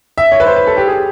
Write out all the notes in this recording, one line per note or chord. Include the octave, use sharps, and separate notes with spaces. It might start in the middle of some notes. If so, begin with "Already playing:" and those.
E5
C#5
B4
C5
B4
A4
G4
G#4